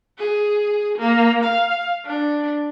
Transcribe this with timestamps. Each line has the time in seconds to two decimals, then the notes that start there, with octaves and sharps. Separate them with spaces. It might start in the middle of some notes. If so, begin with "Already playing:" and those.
0.18 G#4
0.98 A#3
1.44 F5
2.06 D4